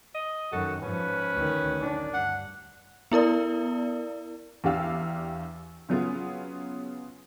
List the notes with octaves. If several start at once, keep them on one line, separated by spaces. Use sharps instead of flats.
D#5
F#2 D#3 F#4 A4
G#2 F3 C#4 B4
D2 D#3
D#3 D4
G2 F#5
B3 E4 A#4 D5
E2 D4 G4 F5 E6
C#3 F#3 B3 F4 G#4